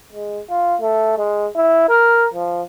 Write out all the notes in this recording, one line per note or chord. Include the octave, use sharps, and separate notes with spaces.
G#3
F4
A3
G#3
E4
A#4
F3